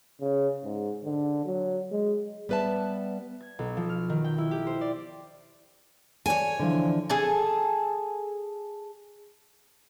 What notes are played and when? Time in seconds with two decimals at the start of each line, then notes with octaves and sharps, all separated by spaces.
0.21 C#3
0.64 G#2
1.05 D3
1.46 F#3
1.92 G#3
2.49 G3 B3 B4 E5 A5
3.41 G#6
3.59 B1
3.77 F3
3.89 F6
4.09 D#3
4.24 G5
4.38 E4
4.51 G4
4.67 C5
4.81 D5
6.26 A4 C#5 D5 G#5
6.59 D3 E3 F3
7.10 G#4 A4 G#5 A5